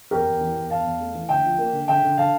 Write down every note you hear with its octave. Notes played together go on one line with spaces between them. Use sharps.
E2 G4 A#4
E2
E3
E2
E2 F5 A5
E2
A3
E3
D2 E5 G5
F3
A#3
D3
D3 E5 G5
D3
D3 F5 A5